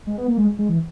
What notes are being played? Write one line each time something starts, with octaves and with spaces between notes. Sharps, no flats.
G#3
B3
A#3
G#3
G#3
E3